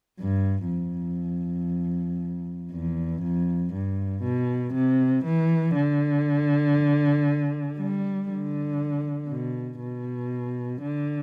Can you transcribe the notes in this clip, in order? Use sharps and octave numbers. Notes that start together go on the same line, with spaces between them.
G2
F2
E2
F2
G2
B2
C3
E3
D3
G3
D3
B2
B2
D3